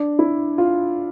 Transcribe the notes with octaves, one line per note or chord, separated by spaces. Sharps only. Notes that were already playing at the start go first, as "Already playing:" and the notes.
Already playing: D4
E4
F4